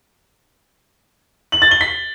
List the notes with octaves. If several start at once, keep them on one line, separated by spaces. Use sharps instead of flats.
F#7
A6
G7
B6